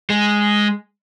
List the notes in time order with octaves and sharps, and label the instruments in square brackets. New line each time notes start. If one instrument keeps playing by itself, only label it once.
[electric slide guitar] G#3